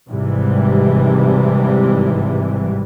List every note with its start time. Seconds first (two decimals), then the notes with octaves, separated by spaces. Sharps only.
0.10 G#1 G#2 C3 E3 G3